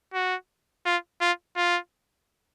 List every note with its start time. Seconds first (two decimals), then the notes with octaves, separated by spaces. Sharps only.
0.14 F#4
0.86 F4
1.21 F4
1.57 F4